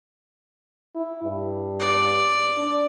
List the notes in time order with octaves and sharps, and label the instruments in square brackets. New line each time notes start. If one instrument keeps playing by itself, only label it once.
[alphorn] E4
G2
[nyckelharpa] D5
[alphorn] D4